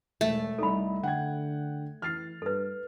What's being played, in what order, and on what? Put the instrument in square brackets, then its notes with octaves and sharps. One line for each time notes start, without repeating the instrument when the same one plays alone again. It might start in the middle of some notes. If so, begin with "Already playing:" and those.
[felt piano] E1 [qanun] A3
[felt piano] C2 D#4 [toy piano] A4 B5
[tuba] D3 [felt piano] F#5 G5 G#6
[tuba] E3 [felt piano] F6 A6 C7
[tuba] G2 [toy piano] A4 B4